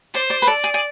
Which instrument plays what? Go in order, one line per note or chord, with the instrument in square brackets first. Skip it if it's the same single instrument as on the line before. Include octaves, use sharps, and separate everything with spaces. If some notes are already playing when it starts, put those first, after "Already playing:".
[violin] C5 [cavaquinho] D5
[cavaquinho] D5
B4
[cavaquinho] A4 [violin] D5
[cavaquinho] G#4
G#4